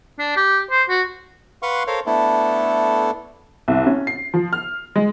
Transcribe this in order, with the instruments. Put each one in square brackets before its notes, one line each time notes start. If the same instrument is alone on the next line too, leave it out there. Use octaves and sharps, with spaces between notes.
[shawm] D4
G4
C5
F#4
[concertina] B4 F5 F#5 C6 C#6
A4 A#4 C5 C#5 F5
A3 B3 D4 E4 A4
[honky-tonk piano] C2
C#4
C7
F3
F6
G#3